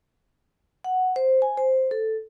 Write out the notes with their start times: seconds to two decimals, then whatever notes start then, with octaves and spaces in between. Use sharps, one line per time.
0.84 F#5
1.16 C5
1.42 G#5
1.57 C5
1.91 A4